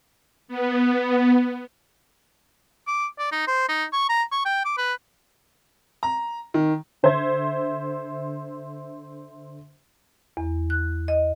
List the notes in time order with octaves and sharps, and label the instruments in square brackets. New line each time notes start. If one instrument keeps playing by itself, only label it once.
[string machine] B3
[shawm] D6
D5
D#4
C5
D#4
C#6
A#5
C#6
G5
D6
B4
[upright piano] A#5
D#3
[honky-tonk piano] D3 C5 E5 C6 G#6
[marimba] E2
F#6
D#5